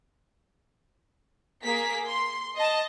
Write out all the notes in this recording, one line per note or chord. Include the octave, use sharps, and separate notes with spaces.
A#3 G#4 A#4 B6
C6
D#5 A5